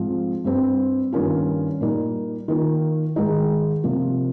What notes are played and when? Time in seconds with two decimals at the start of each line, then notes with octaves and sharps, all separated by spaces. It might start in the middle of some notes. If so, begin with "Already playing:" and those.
Already playing: G#2 F3 C4 F4
0.44 G2 G3 C4
1.12 G2 D#3 A#3 C#4 F4
1.81 A#2 G3 A#3 D#4
2.48 D#3 A#3 F4
3.16 G#2 D#3 G#3 D#4
3.83 C3 F3 A#3 F4